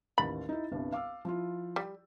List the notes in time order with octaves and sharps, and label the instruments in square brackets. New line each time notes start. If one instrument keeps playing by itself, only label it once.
[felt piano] A1 D#2 A6 [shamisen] B5
[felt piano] D#4 E4
G1 C2 G2
F5 D6 E6
F3 E4 F4
[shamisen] G3